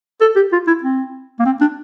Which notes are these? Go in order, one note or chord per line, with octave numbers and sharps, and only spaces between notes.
A4
G4
F4
E4
C4
A#3
C4
D4